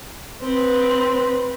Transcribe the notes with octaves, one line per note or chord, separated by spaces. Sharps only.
C4 B4